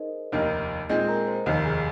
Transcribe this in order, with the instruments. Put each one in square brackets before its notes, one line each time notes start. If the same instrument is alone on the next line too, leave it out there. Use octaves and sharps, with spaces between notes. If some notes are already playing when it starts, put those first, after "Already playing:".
Already playing: [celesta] D#4 G#4 A#4 C5 D#5
[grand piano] F1 D#2 D#3 A#3 D#4
[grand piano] A#2 G#3 C4 G#4 [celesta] D#4 D#5
[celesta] A#4 A#5
C5
[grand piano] F1 D#2 D#3 [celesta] D#4 D#5
[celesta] G#4 G#5